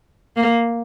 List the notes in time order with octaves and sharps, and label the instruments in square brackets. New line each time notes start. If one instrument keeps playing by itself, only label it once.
[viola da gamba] A#3